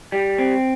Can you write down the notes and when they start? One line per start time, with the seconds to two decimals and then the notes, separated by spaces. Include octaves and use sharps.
0.12 G3
0.38 C4